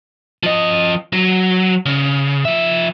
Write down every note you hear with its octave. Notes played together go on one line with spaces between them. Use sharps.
F3 D#5
F#3
C#3
F3 E5